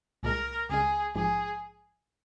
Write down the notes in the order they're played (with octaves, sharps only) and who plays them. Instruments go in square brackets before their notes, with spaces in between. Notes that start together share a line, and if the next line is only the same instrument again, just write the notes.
[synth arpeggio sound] C2 A#2 G#3 [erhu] A#4
[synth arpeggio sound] C#2 C#3 G#3 [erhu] G#4
[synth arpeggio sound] A#1 G#2 F3 G#3 D#4 [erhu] G#4